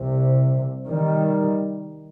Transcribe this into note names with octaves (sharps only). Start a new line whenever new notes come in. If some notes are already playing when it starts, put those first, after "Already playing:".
Already playing: C2 C3
D#3 G3